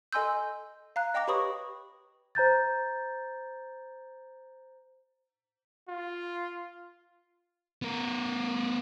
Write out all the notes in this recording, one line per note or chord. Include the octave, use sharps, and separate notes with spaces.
A4 D#5 G#5 C6 E6 G6
F5 A#5 F#6
D#5 G5 A#5 D6 A#6
G4 B4 C#5 B5 C#6 D#6
C5 A#5 G6 A6
F4
B3 A#4